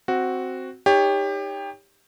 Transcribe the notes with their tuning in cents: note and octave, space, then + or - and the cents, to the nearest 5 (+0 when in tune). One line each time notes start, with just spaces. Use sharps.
C4 +0 F#4 +0
D#4 +0 G4 +25 C#5 +15